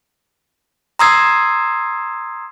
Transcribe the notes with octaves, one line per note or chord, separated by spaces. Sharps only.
A#5 C6 D#6 E6 G#6 C7